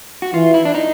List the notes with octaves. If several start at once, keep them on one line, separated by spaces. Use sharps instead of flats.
F#4
E3 F4
E4
D4
D#4